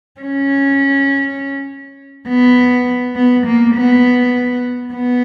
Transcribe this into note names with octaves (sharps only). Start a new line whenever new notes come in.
C#4
B3
B3
A#3
B3
B3